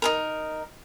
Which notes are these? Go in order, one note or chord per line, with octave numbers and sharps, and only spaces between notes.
D#4 A4 A#4